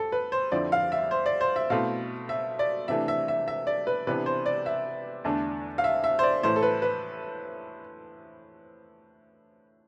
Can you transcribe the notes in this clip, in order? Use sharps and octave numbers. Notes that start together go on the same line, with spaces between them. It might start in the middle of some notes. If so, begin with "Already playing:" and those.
Already playing: F2 A4
B4
C5
F2 D3 F3 C4 E4 D5
F5
E5
C5
D5
C5
E5
B2 A3 C4 E4 F5
E5
D5
C3 E3 A3 D4 E5
E5
E5
E5
D5
B4
C3 E3 B3 D4 B4
C5
D5
E5
E2 D3 A3 D4
F5
E5
E5
C5
D5
A2 E3 A3 C5
A4
B4
B4